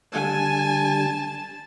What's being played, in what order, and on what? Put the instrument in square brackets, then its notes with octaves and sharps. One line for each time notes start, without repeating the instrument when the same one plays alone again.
[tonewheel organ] D3 G3 [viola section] G#5 [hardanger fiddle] A5